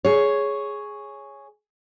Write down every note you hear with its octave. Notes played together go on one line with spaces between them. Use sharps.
G#4 C#5